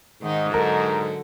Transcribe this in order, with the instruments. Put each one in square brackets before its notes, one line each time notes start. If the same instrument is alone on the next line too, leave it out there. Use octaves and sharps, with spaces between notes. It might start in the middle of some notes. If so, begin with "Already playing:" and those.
[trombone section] G#2 [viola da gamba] D#3 D#4
[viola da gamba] D3 F#3 F#4 [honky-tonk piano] A#4